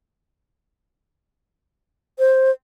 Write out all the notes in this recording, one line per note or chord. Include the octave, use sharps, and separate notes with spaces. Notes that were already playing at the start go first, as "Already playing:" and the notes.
C5